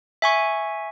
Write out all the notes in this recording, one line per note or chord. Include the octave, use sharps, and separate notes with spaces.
E5 G#5 C#6